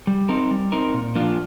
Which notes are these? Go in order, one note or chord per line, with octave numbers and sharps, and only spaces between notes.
G3
C4 D#4 A#4
G3
C4 D#4 A#4
A#2
F3 A#3 D4 F4